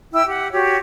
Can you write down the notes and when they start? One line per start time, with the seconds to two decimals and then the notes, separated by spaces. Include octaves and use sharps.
0.13 E4 G5 E6
0.27 G4 F#5
0.51 F#4 G4 C#5